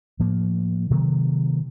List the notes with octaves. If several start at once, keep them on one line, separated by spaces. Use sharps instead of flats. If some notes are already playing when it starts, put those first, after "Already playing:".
A2 F3 A#3
C3 D#3 F#3 A#3